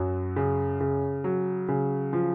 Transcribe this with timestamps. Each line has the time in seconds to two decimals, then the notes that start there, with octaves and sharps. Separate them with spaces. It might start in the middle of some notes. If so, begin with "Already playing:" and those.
Already playing: F#2 F#3
0.36 C#3
0.80 C#3
1.24 F#3
1.68 C#3
2.13 F3